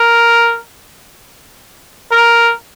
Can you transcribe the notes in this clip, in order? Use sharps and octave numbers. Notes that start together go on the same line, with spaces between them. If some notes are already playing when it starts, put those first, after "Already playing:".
Already playing: A#4
A#4